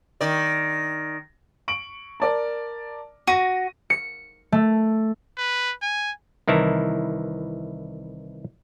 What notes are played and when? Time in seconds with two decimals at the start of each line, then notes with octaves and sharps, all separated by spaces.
0.21 D#3 D5
1.68 C#6 D7 F#7
2.20 A#4 D5 A5
3.27 F#4 A#6 D#7
3.90 C#7
4.52 A3
5.37 B4
5.82 G#5
6.48 C2 D#3 E3 E4 A5 A#5